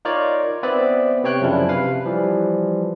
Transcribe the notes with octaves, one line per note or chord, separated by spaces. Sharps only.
D#4 F4 A#4 C#5 D5
B3 C4 B4 C5 D5 E5
C3 C4 C#5 G5 F#6
F#2 C#3 F3 C#4 D4 E4
C3 B4 F5
E3 F3 G3